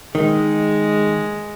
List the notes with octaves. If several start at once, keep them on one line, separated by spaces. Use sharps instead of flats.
D#3 G#3